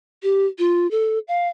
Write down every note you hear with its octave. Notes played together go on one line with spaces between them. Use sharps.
G4
F4
A4
F5